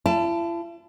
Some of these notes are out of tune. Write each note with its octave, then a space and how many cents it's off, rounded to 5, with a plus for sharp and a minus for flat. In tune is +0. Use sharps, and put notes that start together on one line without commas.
E4 +45 A5 +0